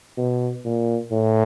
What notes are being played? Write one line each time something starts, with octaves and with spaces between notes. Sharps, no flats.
B2
A#2
A2